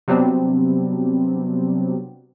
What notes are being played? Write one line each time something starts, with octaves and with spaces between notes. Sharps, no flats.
C3 F#3 G3 B3 C4 D4